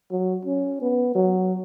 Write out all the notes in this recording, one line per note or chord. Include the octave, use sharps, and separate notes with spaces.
F#3
C#4
B3
F#3